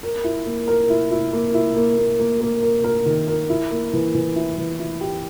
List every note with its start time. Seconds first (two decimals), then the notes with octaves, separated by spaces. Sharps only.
0.03 A#4
0.24 E4
0.46 A#3
0.68 A#4
0.90 E4
1.11 E4
1.33 A#3
1.54 E4
1.77 A#3
1.98 A#3
2.20 A#3
2.41 A#3
2.63 A#4
2.84 A#4
3.06 D#3
3.28 A#4
3.50 E4
3.71 A#3
3.93 E3
4.15 E3
4.36 E4
4.58 E3
4.80 E4
5.01 G4